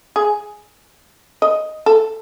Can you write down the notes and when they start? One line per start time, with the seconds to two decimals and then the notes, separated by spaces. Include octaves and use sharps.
0.16 G#4
1.42 D#5
1.86 A4